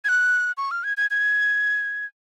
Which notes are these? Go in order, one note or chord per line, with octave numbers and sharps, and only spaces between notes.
G#6
F#6
C#6
F6
G#6
G#6
G#6